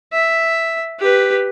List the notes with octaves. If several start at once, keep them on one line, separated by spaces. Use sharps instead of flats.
E5
G4 B4